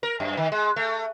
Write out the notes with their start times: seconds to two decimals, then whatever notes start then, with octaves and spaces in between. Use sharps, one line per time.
0.03 A#4
0.20 F#2
0.37 D#3
0.52 G#3
0.76 A3